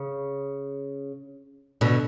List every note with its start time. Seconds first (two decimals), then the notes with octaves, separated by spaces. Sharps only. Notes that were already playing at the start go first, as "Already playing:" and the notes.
Already playing: C#3
1.81 B2 D3